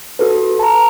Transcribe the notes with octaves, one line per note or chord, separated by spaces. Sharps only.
F#4 A4 B4
A5 A#5